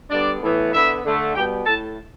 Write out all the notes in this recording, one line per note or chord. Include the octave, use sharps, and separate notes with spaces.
D3 G3 B3 D4 D5
A2 E3 B3
D3 B3 E4 E5
D3 A3
B2 G3 B3 G4 G5
A2 A3 A4 A5